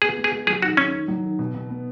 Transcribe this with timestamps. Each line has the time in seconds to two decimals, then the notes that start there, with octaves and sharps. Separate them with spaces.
0.02 B3 G#4
0.17 G#3
0.24 G#4
0.32 G#3
0.47 F#3 G#4
0.62 D#3 F#4
0.77 D#3 C#4
0.93 D#3
1.08 F#3
1.24 D#3
1.39 B2
1.55 B2
1.69 B3